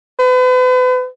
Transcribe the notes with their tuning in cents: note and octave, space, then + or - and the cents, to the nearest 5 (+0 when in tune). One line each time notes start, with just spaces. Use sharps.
B4 +40